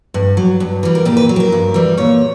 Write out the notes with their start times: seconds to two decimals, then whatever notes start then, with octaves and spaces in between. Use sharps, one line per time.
0.14 G2
0.37 F#3
0.60 G2
0.83 E3 G3
0.95 A#4
1.05 A#2 G4
1.17 B4
1.29 F#3
1.36 G4
1.40 A#4
1.52 G2
1.74 E3 G3
1.97 A#2 C#5